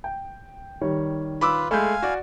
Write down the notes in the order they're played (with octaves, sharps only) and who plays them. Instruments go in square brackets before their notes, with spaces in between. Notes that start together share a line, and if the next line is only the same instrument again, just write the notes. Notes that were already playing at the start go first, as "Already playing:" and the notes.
[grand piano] G5
D#3 G3 C#5
[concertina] F4 B4 [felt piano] B5 D6 E6
[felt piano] G#3 A3 [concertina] F5 G#5 [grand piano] B5 G6
[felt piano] F#4 D5